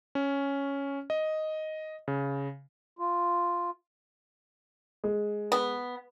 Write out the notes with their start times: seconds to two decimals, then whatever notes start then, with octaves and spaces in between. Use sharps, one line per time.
0.15 C#4
1.10 D#5
2.08 C#3
2.99 F4
5.04 G#3
5.52 B3